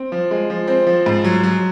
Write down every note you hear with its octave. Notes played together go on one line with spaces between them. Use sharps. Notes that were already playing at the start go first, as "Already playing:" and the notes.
Already playing: C4
F3
G#3
F3
C4
F3
G#2
F#3
F#3